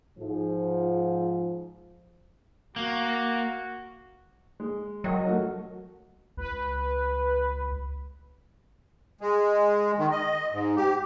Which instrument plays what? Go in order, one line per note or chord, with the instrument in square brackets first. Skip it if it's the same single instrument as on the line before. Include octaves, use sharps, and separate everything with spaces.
[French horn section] G#2 F3
[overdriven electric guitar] A#3 [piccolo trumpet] F#4
[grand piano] G#3
[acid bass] F#3 [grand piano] A#4 D#5 G5
[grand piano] A3 F#4 A#4
[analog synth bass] C#2 [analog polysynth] B4
[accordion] G#3
D#3
D#5
G#2
G4